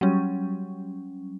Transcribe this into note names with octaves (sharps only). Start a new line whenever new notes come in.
F#3 G3 C#4